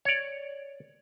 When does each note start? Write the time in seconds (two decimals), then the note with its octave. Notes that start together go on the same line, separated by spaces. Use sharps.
0.05 C#5 D5